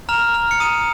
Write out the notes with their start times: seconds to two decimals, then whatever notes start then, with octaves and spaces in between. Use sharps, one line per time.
0.09 A#5 F6 F7
0.34 F6
0.51 C#7
0.60 A#5 D#6 D#7